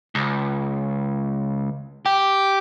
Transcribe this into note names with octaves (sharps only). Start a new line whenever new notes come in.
C#2
G4